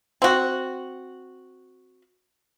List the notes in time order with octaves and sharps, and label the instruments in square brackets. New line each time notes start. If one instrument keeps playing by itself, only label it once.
[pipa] C4 F#4